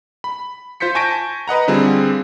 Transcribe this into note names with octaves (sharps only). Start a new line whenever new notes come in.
B5
F4 C5 G6 B6 C#7
G#5 A5 C#6 G6 A#6 D7
B4 D#5 F#5 A#5
D3 G3 C4 F4 G#4